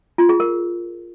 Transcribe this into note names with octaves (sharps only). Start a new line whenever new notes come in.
F4
G#4
A#4